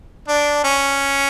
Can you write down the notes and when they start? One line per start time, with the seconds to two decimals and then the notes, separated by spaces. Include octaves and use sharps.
0.28 D4
0.64 C#4